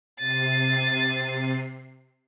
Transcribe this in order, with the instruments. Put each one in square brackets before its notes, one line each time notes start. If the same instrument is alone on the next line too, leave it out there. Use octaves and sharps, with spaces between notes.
[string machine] C3 C7 [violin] A6 D#7